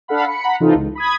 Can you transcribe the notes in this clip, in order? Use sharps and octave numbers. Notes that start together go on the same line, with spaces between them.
D4 A4 F5 F#5 B5
B5 C#7
F#5 A#5 B5
C3 E3 D#4 F4 A4
C#2
B5 D#6 G#6